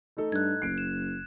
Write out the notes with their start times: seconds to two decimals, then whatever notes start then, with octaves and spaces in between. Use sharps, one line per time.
0.17 A3 D#4 A4
0.32 G2 F#6 G#6
0.62 F#1 C7 D7
0.78 E7